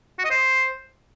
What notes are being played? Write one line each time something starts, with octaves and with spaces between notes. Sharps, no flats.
F#4
D#5
C5